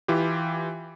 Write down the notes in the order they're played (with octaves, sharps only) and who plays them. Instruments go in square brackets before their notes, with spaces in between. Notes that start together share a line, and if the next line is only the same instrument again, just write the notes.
[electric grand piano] E3 E4 F4 G4